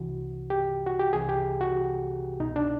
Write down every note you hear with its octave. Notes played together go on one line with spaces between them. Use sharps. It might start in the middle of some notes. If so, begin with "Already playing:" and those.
Already playing: C2 C3 E3 F#4
G4
F#4
G4
C2 C3 E3 G#4
G4
F#4
C2 B2 D#4
D4